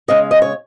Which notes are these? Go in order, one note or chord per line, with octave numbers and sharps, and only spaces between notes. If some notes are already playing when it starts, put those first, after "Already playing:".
C#3 G#3 C#4 D#5
D#5
C#5